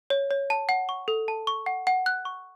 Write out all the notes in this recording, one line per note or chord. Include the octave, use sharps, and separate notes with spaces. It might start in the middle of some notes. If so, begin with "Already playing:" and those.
C#5
C#5
A5
F#5
C#6
A4
A5
C#6
F#5
F#5
F#6
C#6